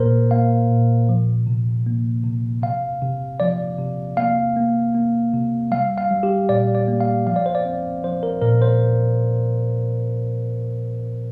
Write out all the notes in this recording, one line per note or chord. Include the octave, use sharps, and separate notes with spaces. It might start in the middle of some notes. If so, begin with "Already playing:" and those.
Already playing: A#2 A#3 A#4 C5
A#3 F5
A#2
F3
C3
A#3
C3
C3 F5
C3
F3 D5
C3
A#3 F5
A#3
A#3
C3
G3 F5
F5
G3
G4
A#2 D5
D5
A#3
F5
F3 F5
D5
C5
D5
C4
F3 C5
A#4
A#2 A#4
C5